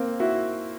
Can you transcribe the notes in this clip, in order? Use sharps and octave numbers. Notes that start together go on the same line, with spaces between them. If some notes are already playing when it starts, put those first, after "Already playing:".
Already playing: A#3 C4
E4 F#4